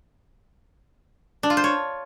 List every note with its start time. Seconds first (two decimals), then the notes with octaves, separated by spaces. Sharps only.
1.43 D4
1.50 F4
1.57 C5
1.64 C#5